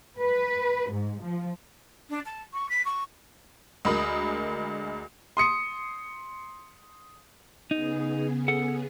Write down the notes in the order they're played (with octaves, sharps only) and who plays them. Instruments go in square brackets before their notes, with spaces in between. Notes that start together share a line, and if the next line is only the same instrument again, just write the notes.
[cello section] B4
G#2
F3
[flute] D4
A5
C#6
B6
C#6
[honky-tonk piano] D2 G#3 A#4 B5 D#6
[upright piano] C6 D#6 C#7
[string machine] C#3 B3 G#4 [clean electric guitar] D#4
[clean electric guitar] A4 F#5